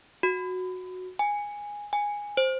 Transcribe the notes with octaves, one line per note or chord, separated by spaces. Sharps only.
F#4
G#5
G#5
C5